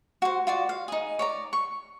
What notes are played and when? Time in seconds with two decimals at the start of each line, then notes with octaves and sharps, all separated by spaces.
0.22 F#4 C5
0.47 F4 F#4 D5
0.69 F5
0.88 D#4 G#4
1.19 C#5 D5 A#5
1.53 C#6